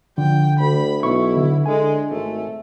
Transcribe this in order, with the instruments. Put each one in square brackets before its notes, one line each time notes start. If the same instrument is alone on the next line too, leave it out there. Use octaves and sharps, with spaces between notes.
[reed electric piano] D3 [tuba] F3 [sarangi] G5
[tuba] D2 [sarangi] B5
[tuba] B1 [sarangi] E4 [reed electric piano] C#6
[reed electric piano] D3
[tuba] D3 [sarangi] G#3 [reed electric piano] G#5
[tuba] G#1 [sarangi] A3